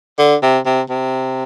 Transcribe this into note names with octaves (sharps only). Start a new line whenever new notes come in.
D3
C3
C3
C3